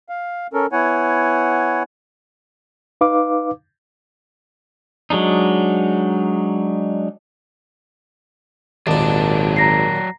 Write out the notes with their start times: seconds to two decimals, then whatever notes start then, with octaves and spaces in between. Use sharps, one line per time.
0.09 F5
0.53 C#4 A4 A#4
0.72 B3 E4 C#5 F#5 G#5
3.01 D#4 B4 F5 D6
5.10 F#3 G#3 D4 D#4
8.87 G#1 D#2 A#2 F#3 D5 A5
9.56 A#5 A#6 C7